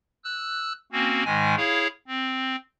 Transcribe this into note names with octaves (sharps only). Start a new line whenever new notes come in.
E6 F#6
A#3 C4 C#4 F#4
G#2 D#3 G#3 G#5
E4 G#4 C#5 F5
C4